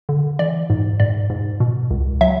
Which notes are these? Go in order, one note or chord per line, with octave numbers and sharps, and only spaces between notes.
D3
E3 D5
G#2
G#2 D5
G#2
B2
C#2
F#3 E5